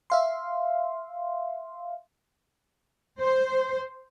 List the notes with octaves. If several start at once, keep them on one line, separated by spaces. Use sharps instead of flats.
E5 F5 C6
C5